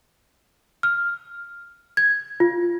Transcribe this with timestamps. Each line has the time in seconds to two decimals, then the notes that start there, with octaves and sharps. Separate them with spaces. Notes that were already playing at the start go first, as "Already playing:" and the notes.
0.83 F6
1.97 G#6
2.40 F4